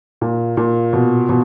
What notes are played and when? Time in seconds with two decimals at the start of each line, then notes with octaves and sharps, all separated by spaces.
0.21 A#2
0.57 A#2
0.93 B2
1.29 B2